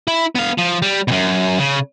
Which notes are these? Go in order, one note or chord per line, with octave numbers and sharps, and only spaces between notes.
E4
B3 F5
F3
G3
F#2 B2
C#3